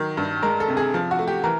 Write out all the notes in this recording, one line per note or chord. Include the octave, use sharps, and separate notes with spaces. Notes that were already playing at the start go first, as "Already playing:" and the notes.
Already playing: D#3 F#3
G2
G#3 A#4
A4
C3
G#4
F3
F#4
A3
G4
E3 A#4